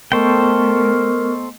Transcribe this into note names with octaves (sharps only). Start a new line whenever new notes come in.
A3 B3 A4 A#4 C5 D#5 G5 C#6